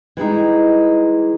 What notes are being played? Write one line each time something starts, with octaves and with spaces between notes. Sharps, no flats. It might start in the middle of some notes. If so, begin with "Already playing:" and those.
E3 G3 G#3 D#4